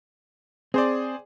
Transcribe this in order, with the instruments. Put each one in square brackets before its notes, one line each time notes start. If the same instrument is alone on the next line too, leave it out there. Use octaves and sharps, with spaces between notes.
[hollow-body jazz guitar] C4 [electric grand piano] G#4 C5 D5